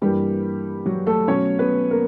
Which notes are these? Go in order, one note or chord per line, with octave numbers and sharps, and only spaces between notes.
G2 E3 G3 A#3 G4
F#3 F#4
A3 A4
B2 F#3 A3 C#4 C#5
B3 B4
A#3 A#4